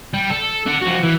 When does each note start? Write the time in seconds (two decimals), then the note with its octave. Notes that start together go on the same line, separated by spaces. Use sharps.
0.14 G3
0.30 A4
0.67 D4 F#5
0.82 F2 F#4
1.04 E3